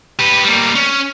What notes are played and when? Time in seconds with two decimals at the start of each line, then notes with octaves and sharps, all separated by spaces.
0.19 G4 B4
0.45 G3 A#3
0.75 C#4